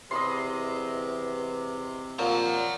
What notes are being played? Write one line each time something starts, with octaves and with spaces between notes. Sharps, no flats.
E2 C3 D#5 B5 C6
A#2 F3 F#5 A#5